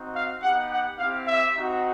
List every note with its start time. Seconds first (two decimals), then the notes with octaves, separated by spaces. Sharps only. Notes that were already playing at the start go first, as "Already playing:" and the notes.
Already playing: C4 D#4 F#4
0.14 F5
0.42 B3 D#4 G4 F#5
0.71 F#5
0.98 C4 E4 G4 F5
1.27 E5
1.54 C4 D#4 F#4